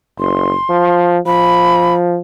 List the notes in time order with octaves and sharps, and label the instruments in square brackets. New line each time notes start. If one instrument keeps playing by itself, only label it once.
[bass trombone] F#1 [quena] C6
[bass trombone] F3
[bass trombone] F3 [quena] B5